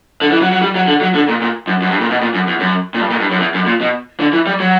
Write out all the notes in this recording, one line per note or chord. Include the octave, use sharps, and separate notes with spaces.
D3
E3
F#3
F#3
G3
F#3
D3
F#3
D3
A#2
A#2
F#2
F#2
G2
A#2
B2
A#2
F#2
E2
F#2
A#2
G2
A#2
G2
F#2
E2
F#2
A#2
B2
D3
E3
G3
F#3